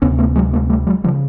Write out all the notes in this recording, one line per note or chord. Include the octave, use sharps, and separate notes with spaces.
D2 C3 B3 C#4
A3 B3
F#3 G#3
G#3 A#3
G3 A3
F#3 G#3
C#3 F3 G3